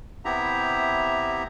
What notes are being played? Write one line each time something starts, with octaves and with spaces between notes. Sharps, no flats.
C3 B3 E4 G4 E5 A#5